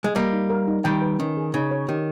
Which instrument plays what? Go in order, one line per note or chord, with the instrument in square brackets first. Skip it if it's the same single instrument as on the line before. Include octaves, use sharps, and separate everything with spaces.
[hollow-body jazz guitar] G#3
[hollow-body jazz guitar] G3 A#3 [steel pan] D#5
[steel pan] D#4
A#4
D#4
[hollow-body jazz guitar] D#3 G3 [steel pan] G5
[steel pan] B4
[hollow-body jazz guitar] D#3 [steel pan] C#4
[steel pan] G#4
[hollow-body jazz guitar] C#3 [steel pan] D#4
[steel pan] C#5
[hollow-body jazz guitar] D#3 [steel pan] G4